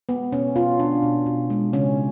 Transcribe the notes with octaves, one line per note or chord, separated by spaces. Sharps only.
G#3 B3
B2 C#4
B2 F4
B2 D4
B2
B2
G#3
C#3 C#4